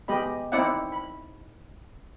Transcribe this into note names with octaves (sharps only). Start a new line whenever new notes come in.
G#3 B3 G4 D#5 B5
C4 D#4 E4 D5 E5 F#5
B5